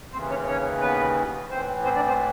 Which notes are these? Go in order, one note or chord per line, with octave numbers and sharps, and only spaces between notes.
D#2 C#3 E3 C4 C5
C#4 C#5
C#4 C#5
B3 B4
A2 E3 C4 C5
C4 C5
D4 D5
C4 C5